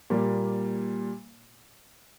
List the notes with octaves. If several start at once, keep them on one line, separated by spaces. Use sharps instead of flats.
A#2 G3 A#3